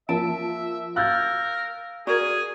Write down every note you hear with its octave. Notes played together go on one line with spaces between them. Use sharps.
F3 A#3 E5 A5 D7
A#4 F5 E6 F#6 G6 A6
F#4 G#4 A#4 D5 G#6